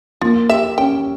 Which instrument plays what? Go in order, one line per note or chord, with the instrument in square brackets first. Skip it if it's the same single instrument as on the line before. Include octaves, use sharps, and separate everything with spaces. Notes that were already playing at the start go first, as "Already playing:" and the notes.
[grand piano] A#3 [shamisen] F4
[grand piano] G4 [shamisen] E5
[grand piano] C#4 [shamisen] G5